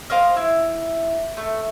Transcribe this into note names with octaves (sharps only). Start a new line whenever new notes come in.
A#4 C5 D#5 F5
E4
A3